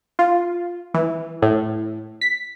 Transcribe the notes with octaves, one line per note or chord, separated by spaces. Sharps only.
F4
E3
A2
B6